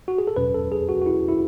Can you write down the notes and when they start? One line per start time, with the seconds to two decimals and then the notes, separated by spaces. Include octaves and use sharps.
0.08 F#4
0.18 G#4
0.27 A4
0.36 E2 B2 F#3 C#4 B4
0.54 A4
0.72 G#4
0.89 F#4
1.02 F#4
1.06 E4
1.28 E4